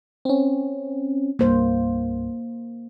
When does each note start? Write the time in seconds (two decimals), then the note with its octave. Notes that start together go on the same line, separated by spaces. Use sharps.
0.25 C4 C#4
1.39 C2 G2 A#3 C5